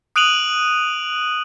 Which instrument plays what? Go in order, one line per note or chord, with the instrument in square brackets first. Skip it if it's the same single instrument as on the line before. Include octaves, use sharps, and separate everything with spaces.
[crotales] D#6 F#6 D7 D#7 F7 F#7